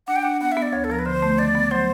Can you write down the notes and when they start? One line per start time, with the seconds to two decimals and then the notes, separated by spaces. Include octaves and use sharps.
0.07 D4 F#5
0.16 G5
0.23 D4 F#5
0.41 B3 F#5
0.52 E5
0.57 B3
0.62 D5
0.72 D2 C#5
0.84 A4
0.90 F3 A#4
0.99 B4
1.05 D3 C5
1.22 A3
1.38 D#3 D5
1.55 B3
1.71 F#3 C5